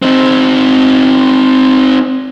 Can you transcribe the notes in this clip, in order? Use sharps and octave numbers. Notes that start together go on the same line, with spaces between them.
C4 D#4